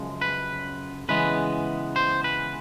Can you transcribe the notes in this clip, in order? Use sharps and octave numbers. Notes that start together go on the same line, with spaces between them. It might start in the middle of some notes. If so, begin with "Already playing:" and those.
Already playing: F#2 C#3 F3 G#3
B4
C#3 E3 G#3 B3 B4
C5
B4